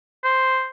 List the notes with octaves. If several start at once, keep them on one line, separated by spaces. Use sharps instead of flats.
C5